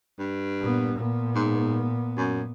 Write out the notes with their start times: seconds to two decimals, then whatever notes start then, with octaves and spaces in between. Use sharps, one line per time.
0.20 G2
0.60 A#2 B3
0.95 A#2 B3
1.36 G#2
2.17 F#2